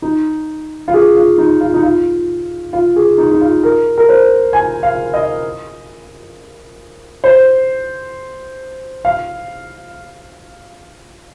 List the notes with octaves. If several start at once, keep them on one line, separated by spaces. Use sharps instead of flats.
D#4
F4
G#4
F4
D#4
F4
D#4
F4
F4
G#4
D#4
D#4
F4
A#4
A#4
C5
G#5
F5
D#5
C5
F5